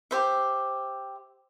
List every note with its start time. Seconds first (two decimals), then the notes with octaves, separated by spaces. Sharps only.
0.11 G4 C5 E5